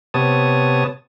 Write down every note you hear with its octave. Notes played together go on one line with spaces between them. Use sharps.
C3 B3 C#5 A5 D#6